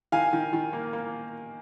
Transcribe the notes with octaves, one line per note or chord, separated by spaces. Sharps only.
D#3 F5 G#5
D#3
D#3
A#3
A#3